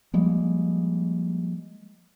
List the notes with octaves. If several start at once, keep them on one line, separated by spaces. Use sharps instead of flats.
F3 G3 G#3 A#3